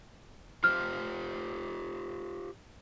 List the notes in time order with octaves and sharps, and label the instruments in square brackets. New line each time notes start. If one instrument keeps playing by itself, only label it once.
[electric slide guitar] F4 G4 C5 [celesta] F6